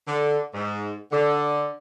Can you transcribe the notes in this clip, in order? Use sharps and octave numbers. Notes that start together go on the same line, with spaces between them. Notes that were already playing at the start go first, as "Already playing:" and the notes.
D3
G#2
D3